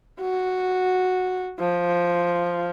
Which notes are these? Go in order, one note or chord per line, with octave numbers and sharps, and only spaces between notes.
F#4
F3